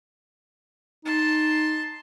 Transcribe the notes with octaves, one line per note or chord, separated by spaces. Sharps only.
D#4 A5 C6